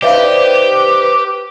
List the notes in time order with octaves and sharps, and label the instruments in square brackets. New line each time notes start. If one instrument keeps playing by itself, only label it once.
[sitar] D#4 C5 [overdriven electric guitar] G4 [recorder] B4 [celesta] D5 E5 F5